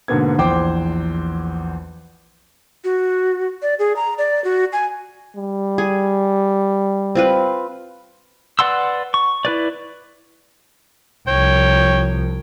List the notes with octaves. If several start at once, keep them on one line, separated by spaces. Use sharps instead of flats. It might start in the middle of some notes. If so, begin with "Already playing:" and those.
G#2 B2 D3 A#3 B3 G#6
A#1 E2 C5 G5 C6 D6
F#4
D5
G#4
A#5
D5
F#4
G#5
G3
G#4
C4 F4 B4
B4 D5 F#5 C6 E6
C#6
E4 B4 D5
C2 F3 C#5 G5